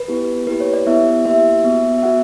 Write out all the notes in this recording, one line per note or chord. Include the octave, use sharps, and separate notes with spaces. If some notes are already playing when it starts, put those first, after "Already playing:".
Already playing: B4
B3 E4 G4
A#3 E4 G4 B4
C#5
D5
B3 E4 G4 E5
A#3 E4 G4 E5
B3 F#4
E5
B3 F#4 F#5